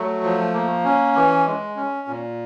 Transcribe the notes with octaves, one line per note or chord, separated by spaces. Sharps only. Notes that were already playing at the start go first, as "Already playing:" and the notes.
Already playing: F#3 A3
F3
A#3
C#4
E3
G#3
C#4
A#2